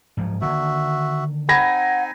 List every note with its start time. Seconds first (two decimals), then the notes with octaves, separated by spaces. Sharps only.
0.17 G#2 F3 F#3
0.41 D3 D#3 A#3 F#4 E5
1.49 C4 D#4 F#5 G#5 B5 G#6 A#6